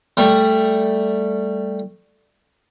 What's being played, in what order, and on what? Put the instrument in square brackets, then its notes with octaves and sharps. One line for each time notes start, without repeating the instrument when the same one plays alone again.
[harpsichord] G3 A3